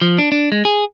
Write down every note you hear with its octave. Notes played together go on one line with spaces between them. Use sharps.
F3
D4
D4
G#3
G#4